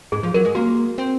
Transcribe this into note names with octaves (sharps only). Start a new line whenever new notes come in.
G#2 G#4
F3
F#3 A#4
G#3
A#3 F#4
C4